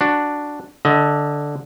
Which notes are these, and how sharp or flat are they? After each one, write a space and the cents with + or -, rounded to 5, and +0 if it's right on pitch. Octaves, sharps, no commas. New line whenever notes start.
D4 +0 F#4 +0
D3 +0 D#5 +25